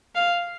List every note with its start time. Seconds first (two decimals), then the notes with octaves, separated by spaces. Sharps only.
0.15 F5